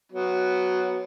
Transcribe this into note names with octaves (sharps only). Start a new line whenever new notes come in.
F#3 B3